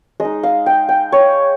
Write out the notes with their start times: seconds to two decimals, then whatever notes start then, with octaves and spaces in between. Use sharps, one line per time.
0.20 G#3 D#5
0.25 D#4
0.43 F5
0.66 G5
0.89 G5
1.12 C#5